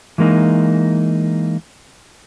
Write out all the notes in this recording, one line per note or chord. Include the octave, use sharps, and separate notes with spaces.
E3 G#3 A#3 D#4